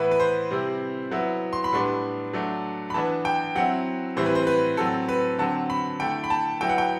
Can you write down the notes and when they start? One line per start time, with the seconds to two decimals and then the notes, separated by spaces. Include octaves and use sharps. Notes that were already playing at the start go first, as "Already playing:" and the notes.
Already playing: A2 E3 B3 E4 B4
0.11 B4
0.20 C5
0.50 C3 G3 C4 E4
1.11 F#3 B3 E4
1.53 C6
1.64 B5
1.73 A2 G3 B3 D4 C6
2.33 F#3 A3 D4
2.90 B5
2.94 E3 B3 D4 A5
3.25 G5
3.55 F#3 C4 E4 F#5
4.16 A2 E3 G3 C4 E4 C5
4.26 B4
4.35 C5
4.47 B4
4.77 A2 F#3 C4 A4
5.09 B4
5.38 D3 F#3 C4 A5
5.70 B5
6.00 D3 A3 E4 G5
6.24 B5
6.30 A5
6.61 F#3 B3 E4 G5
6.69 F#5
6.78 G5